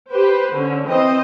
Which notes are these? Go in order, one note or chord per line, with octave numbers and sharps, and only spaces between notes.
G4 B4 C5
D3 C#4
E3 C4 C5 D#5